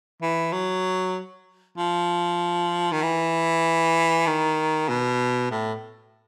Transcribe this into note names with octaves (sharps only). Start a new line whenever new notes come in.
E3
F#3
F3
D#3
E3
D#3
B2
A2